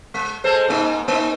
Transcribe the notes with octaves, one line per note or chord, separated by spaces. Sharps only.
G#3
G#3 A4 C5
G#2 A#3 D#4
A#3 D#4